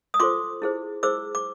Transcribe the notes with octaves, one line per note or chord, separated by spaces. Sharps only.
D#6
F4 A4 C5 C6 D6
E4 G#4 C5
E4 G#4 C5 D6 E6
D6